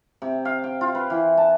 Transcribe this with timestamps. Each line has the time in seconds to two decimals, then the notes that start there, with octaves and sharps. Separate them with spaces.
0.22 C3
0.45 F5
0.64 G5
0.81 F4
0.95 B4
1.10 E3
1.37 A5